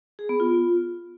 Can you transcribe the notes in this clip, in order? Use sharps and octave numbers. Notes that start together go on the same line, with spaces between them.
G#4
B3
F4